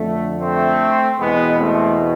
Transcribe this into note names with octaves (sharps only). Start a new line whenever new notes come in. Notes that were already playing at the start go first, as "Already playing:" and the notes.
Already playing: F2 D3 A3
A3 C4
E2 B2 G#3 B3
A3 C4